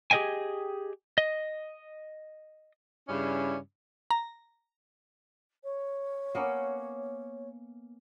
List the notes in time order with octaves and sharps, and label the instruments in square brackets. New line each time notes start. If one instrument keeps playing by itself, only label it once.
[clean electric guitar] G4 G#4 B4 D#5 G5 G#5
D#5
[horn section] G2 C#3 C#4 E4 D5
[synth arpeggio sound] A#5
[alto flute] C#5
[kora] A#3 B3 C#4